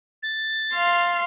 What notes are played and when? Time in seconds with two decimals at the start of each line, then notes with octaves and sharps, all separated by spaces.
0.23 A6
0.74 F5 C6